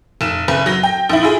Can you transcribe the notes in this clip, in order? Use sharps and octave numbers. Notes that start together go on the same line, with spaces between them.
F1 E7
F#1 B4
F#3 A#6
G5
A#1 E4
E4 F4 G#4